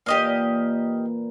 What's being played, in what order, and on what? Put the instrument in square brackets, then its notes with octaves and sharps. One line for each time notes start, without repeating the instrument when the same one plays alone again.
[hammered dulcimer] A#2 E3 A#3 [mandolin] G4 D#5 F5